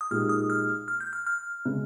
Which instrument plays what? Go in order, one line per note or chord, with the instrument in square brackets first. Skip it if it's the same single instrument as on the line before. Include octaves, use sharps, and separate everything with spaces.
[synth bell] D#6
[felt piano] A#2 G#3 D#4 G4 [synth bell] F6
[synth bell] D#6
F6
F6
G6
F6
F6
[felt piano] C#3 G#3 C#4